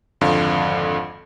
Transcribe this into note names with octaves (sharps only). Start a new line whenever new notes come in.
G#1 F2 D3 F5